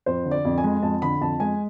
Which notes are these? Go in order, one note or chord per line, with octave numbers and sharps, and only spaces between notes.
F2 C5
D3
D5
F2
G#5
G#3
F2 A5
D3 B5
F2 A5
G#3 G#5